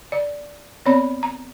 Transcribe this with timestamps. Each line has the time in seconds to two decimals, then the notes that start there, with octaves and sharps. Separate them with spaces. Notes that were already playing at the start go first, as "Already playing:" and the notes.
0.12 D5
0.86 B3 C4 C#5 D5 B5
1.23 A#5